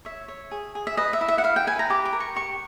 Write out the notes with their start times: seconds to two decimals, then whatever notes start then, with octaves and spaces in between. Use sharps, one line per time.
0.05 C#5 E5
0.28 C#5
0.51 G#4
0.75 G#4
0.87 E5
0.97 B4 D#5
1.13 E5
1.21 E4
1.28 E5
1.38 F#5
1.44 E4 F5
1.56 G5
1.67 B4 G#5
1.79 A#5
1.90 G4 D6
2.05 D6
2.13 A#4
2.20 C#6
2.36 G4 C#6